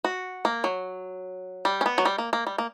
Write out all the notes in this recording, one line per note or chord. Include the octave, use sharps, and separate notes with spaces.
F#4
A#3
F#3
G3
C#4
B3
F#3
G3
A#3
A#3
G3
A#3